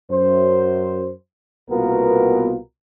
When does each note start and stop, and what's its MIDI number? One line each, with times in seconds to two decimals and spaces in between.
0.11 1.11 42
0.11 1.11 72
1.71 2.56 36
1.71 2.56 47
1.71 2.56 58
1.71 2.56 59
1.71 2.56 65
1.71 2.56 70